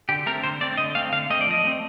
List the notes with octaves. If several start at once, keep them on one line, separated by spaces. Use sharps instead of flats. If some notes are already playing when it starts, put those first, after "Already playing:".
D3 G4
A3 C4 A#4
D3 C5
A3 C4 D5
D3 D#5
A3 C4 F5
D3 F5
A3 C4 D#5
D5
F3 D#5
A3 C4